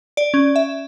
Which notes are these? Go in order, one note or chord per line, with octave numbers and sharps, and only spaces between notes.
D5
C#4
E5